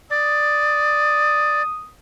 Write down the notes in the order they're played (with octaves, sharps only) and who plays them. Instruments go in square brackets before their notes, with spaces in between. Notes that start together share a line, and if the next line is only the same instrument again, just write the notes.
[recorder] D5 [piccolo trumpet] D#6